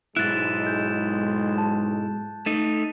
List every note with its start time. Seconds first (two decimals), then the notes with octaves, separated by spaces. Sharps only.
0.16 B1 G#2 G#3 E4 F#6 A6
0.67 G6
1.58 A5
2.46 A3 D#4